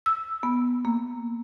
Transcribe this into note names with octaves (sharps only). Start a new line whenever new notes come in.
E6
B3
A#3